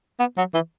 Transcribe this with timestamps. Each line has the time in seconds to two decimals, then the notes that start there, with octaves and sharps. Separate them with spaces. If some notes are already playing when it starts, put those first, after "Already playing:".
0.19 B3
0.37 F#3
0.54 E3